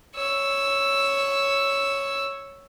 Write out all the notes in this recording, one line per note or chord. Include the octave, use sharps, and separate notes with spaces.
C#5 E6